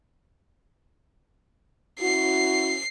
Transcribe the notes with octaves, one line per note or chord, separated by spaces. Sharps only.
C#4 E4 F#4 C7